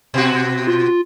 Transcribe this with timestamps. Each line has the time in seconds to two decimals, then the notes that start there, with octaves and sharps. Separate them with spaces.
0.14 B2 F#4
0.67 F4